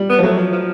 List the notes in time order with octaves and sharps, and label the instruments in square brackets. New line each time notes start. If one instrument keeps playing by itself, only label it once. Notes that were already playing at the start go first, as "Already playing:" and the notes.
Already playing: [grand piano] G3
[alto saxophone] B3
[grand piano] F3
[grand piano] F#3 [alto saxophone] A3
[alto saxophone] F3
F3